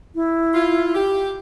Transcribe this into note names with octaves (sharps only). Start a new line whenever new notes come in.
E4
F4
G4